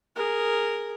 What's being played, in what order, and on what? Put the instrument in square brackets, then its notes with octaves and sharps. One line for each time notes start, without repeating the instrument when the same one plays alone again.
[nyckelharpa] G#4 A#4